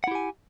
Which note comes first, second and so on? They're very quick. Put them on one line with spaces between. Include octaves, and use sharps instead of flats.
F#5 E4 G4 G#5